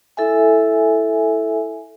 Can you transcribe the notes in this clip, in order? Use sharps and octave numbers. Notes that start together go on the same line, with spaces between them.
E4 A4 E5 G#5